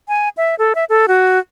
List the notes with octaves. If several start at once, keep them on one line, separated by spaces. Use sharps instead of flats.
G#5
E5
A4
E5
A4
F#4